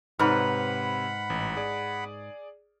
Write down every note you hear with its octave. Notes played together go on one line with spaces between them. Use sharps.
G#2 C3 B4 C#5 F#5 B5 F6
A1
G#4 D5